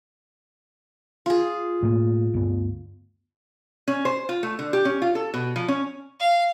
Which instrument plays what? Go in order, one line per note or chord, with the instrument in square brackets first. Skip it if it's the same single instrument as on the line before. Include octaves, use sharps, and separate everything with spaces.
[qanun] F4 G#4
[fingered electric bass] A2 A#3
D2 G2 B3
[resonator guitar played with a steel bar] C#4
C5
F4
A3
D3
G4
C#4
F4
A4
B2
F3
C#4
[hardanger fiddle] F5